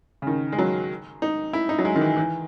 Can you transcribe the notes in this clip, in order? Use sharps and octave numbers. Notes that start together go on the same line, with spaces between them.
C#3
D#3
G#3
F#3
D#4
E4
D#4
F#3
G#3
D#3
E3
E3